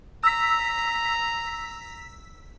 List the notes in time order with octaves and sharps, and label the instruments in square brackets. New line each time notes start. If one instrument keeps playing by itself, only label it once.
[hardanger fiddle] A#5 [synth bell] E6 B6